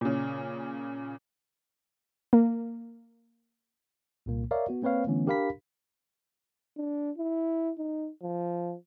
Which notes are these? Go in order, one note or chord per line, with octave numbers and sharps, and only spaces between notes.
A#2 C#3
A#3
C2 A#2 A#3
A#4 C#5 D5 E5 F5
B3 F#4
A#3 C4 B4 C#5 F5
D3 E3 A3 B3 C#4
D4 G4 A#4 F5 B5 B6
D4
E4
D#4
F3